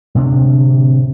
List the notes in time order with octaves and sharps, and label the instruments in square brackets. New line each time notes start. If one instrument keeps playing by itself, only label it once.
[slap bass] D1 C3 C4 D4